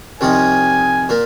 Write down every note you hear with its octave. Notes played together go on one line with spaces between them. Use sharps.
C2 C3 F3 C4 D#4 G#5
A#2 A#3